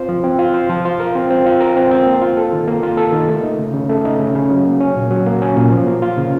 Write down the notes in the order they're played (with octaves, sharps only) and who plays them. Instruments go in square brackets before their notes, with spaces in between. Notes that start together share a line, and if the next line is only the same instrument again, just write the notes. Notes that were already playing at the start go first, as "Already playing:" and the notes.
Already playing: [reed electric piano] C4 F4 C5
F3
C4
F4
C5
F3
F4
A#4
C4
C4
F4
A#4
C4
C4
A#3
F4
A4
D#3
A#3
F4
A4
D#3
A3
D#4
C#3
C#3
A3
D#4
C#3
C#3
F#3
A#3
C#4
A#2
F#3
A#3
C#4
A#2
F3
A#3
F4
C#3